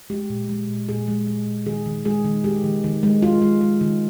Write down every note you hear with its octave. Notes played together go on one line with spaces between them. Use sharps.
G#3 G4
A#2
G#3
A#2
A#2 G#4
G#3
G#3
A#2
D#3 G#4
D#3
G#3 G#4
D#3
G#3 G4
D#3
D#3
G#3
G#3 F4
G#3
G#3
D#3